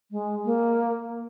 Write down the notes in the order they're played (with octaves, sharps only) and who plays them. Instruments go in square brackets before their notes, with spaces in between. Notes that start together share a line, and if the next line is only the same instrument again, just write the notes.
[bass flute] G#3
A#3